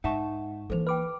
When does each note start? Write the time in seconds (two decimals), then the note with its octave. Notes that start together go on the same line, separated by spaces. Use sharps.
0.04 G#2 D#4 E5 F#5 A5 C#6
0.70 E3 A#3 A4 C5 F7
0.87 B4 G5 B5 D6 F6